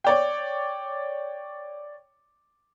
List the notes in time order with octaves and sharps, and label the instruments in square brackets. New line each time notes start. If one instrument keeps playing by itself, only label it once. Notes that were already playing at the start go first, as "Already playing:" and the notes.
[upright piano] C#5 D5 G5